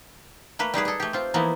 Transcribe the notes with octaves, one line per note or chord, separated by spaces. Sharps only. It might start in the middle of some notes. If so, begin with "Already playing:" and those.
A3 A#3 B4
G3 D#4 G#4 B4
G#4 A4
A3 G4
C4 F4
E3 F3 A#3 B3 D#4 E4